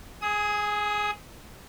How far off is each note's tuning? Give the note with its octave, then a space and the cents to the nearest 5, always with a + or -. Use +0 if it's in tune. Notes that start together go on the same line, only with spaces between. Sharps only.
G#4 +0 D#6 +30